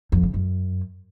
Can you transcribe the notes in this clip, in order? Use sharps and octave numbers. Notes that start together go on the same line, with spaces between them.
F2
C#3
F#2